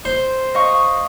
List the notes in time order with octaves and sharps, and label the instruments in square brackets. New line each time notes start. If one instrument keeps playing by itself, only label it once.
[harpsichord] C5
[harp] D#5 F5 C#6